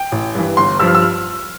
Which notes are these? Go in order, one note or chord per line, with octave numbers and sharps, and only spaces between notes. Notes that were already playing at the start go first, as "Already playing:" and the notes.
Already playing: G5
A1
G2 E3
G1 C6
G2 F3 E6
F6
E6
F6